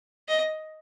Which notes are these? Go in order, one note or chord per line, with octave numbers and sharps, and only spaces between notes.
D#5